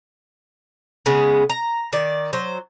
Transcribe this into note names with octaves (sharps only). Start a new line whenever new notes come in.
C#3 G#3 B3
A#5
D#3 D5
F#3 C5